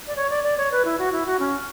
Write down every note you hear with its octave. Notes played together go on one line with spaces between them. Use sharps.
D5
C#5
D5
D5
C#5
B4
E4
F#4
E4
F#4
C#4